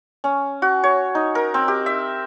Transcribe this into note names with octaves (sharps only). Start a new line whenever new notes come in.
C#4
F#4
C#5
D#4
A#4
C4
G4
E5